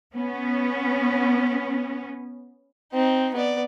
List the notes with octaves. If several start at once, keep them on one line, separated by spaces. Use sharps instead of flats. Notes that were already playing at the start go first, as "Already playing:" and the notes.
B3 C#4
C4 D#4
B3 D5